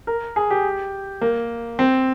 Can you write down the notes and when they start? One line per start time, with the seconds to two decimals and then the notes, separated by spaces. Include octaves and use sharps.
0.07 A#4
0.36 G#4
0.50 G4
1.21 A#3
1.79 C4